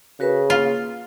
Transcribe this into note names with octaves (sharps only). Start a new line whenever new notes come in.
C#3 F#4 A#4 B4
A#3 F4